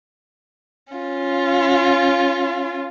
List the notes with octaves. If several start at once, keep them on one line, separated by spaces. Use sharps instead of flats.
C#4 F4